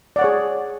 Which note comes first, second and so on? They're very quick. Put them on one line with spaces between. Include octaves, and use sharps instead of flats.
D5 F#5 C#5 G#4